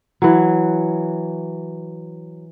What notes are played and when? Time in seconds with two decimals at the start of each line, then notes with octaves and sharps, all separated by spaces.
0.22 E3 F#3